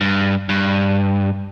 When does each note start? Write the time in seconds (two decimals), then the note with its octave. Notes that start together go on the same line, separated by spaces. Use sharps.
0.01 G2
0.49 G2